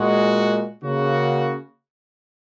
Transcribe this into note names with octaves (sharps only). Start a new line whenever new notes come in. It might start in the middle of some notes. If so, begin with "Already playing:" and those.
Already playing: A#2 G#3 F#4
C#3 A#3 F#4